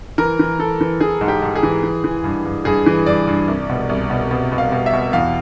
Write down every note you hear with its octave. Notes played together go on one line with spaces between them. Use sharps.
E3 A#4
E3
E3 A4
E3
E3 G#4
G#2
G4
G#2
G#4
E3
E3
E3
G2
G2
G2 G#4
E3
G2 D5
G2
C2
B2
C2
B2
B2
B2
F5
B2
E5
B2
E2 F5